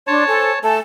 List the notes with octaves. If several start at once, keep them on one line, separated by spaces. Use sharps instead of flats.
D4 C#5 A5 C6
A4 C5 G#5
A3 A4 G#5 A5